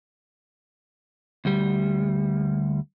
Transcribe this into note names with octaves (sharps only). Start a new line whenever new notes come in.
D2 G3